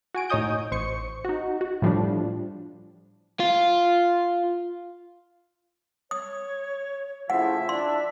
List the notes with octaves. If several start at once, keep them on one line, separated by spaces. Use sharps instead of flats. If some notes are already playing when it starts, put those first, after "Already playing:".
F#4 G#5 D7
A2 D#4 C#5 D#5 D#6 G6
A1 C5 C#6 C#7
D#4 F#4
F#4
A2 F3 G3 D4
F4
C#5 D#6
A2 C#3 F3 E4 E5 F#5
D4 C6